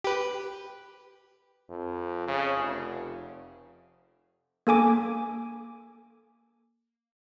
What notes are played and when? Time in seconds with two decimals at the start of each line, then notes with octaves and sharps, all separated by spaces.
0.04 G4 B4
1.69 F2
2.28 C#3
2.57 F1
4.67 A#3 A4 G#5 D6